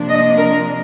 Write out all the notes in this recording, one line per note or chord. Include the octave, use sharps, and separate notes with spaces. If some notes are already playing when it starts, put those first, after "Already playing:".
Already playing: C3 F3 A#3 D4
D#5
A#4